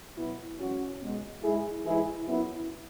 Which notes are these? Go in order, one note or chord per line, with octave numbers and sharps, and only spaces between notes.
B2 F#3 B3 E4
F#2 E3 G#3 C#4 F#4
B2 G#3
G#2 G#3 E4 G#4
G#2 E3 G#3 E4 G#4
F#2 F#3 B3 E4